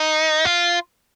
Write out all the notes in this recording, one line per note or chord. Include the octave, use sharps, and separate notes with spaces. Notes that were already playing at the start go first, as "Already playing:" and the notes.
Already playing: D#4
F4